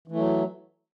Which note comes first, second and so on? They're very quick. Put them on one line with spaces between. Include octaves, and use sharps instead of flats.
E3 A3 F#3